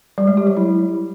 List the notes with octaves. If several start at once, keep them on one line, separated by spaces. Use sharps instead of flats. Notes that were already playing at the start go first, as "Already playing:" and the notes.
G3
G#3
G4
F#3
E4